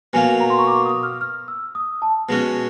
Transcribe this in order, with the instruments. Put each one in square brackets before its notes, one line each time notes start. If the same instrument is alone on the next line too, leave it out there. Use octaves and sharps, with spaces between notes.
[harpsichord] B2 F#3 A#3 [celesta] G#5
[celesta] A#5
C6
C#6
D6
D#6
F6
F6
E6
D#6
A5
[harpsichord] B2 G#3 C#4 F#4